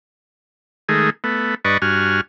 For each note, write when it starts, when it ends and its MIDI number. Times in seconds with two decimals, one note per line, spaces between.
0.89 1.10 51
0.89 1.10 56
0.89 1.10 57
0.89 1.10 68
1.24 1.55 57
1.24 1.55 59
1.65 1.78 43
1.65 1.78 71
1.65 1.78 74
1.65 1.78 75
1.65 1.78 85
1.82 2.21 43
1.82 2.21 66
1.82 2.21 80
1.82 2.21 89